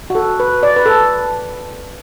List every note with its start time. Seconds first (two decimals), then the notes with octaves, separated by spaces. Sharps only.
0.10 F#4
0.15 A4
0.40 B4
0.63 D5
0.76 B4
0.86 A4